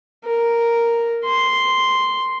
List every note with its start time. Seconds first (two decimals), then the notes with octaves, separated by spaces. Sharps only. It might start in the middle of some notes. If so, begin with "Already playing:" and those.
0.25 A#4
1.25 C6